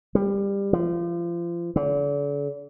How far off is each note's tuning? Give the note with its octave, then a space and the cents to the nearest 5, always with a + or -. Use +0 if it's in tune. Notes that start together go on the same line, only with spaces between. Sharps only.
G3 +20
F3 -30
D3 -40